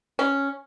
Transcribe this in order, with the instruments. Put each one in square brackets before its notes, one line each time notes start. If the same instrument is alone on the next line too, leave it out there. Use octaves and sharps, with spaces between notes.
[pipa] C#4